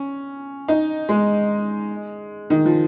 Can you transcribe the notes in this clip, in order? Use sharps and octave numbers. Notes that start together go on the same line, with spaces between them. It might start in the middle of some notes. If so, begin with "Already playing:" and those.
Already playing: C#4
D#4
G#3
D#3
F3